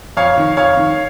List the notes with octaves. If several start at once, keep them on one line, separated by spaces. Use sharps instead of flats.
F2 C#5 F5
D#3
F2 C#5 F5
D#3